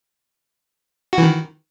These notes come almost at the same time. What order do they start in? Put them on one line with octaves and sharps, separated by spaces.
F#4 E3 D#3